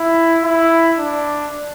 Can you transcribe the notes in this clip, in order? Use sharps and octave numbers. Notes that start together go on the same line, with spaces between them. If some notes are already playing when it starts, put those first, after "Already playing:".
Already playing: E4
E4
D4